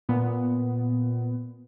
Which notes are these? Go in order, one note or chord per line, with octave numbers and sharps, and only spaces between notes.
A#2 B3